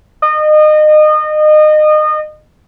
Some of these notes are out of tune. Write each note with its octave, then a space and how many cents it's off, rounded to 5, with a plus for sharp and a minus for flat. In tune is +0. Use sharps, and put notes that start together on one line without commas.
D#5 -30